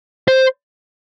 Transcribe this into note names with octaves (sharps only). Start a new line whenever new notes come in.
C5